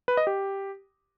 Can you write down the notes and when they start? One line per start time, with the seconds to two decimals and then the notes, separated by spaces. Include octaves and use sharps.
0.08 B4
0.17 D#5
0.27 G4